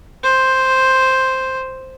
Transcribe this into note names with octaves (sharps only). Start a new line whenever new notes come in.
C5